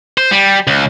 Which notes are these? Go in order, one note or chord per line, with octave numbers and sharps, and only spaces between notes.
C5
G3
C#2